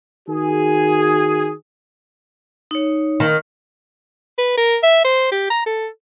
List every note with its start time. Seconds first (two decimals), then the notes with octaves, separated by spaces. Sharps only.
0.28 D#3 F#4 G#4
2.71 D#4 C#5
3.20 D#3
4.38 B4
4.57 A#4
4.83 E5
5.04 C5
5.32 G4
5.50 A#5
5.66 A4